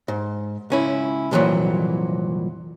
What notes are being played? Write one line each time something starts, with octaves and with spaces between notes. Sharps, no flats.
G#2
C#2 C#4 E4
C2 F2 A#2 C#3 E3 F#3